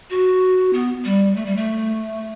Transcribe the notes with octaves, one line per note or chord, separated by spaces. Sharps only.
F#4
B3
G3
A3
G3
A3